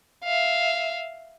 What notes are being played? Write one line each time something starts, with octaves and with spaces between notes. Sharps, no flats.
E5 F5